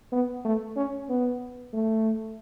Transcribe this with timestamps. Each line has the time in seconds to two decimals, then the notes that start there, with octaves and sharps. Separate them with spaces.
0.12 B3
0.45 A3
0.76 C#4
1.09 B3
1.73 A3